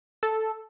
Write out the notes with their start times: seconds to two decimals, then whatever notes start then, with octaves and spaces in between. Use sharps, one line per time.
0.23 A4